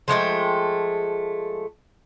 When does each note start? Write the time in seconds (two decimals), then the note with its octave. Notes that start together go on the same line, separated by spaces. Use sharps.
0.08 F3 G#3 A3 G5